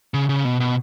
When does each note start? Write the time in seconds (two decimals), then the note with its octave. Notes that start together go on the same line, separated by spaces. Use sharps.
0.14 C#3
0.29 C#3
0.45 B2
0.60 B2